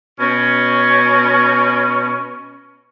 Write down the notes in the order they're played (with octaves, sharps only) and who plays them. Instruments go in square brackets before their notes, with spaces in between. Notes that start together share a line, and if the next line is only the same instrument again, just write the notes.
[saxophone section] B2 C#4